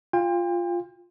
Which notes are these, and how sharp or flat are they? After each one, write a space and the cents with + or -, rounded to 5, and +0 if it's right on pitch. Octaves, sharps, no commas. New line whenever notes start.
F4 +0 G5 +35